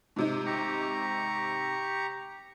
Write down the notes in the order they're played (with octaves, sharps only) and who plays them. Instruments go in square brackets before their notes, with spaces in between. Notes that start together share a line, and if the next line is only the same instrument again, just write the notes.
[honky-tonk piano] G#2 C3 D#4
[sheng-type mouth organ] G4 A#5 C#6